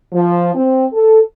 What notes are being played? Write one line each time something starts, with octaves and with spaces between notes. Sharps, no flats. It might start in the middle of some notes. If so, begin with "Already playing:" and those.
F3
C4
A4